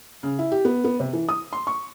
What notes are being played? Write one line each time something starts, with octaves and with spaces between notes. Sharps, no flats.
C#3
E4
G4
B3
B3
C3
E3
D#6
C6
C#6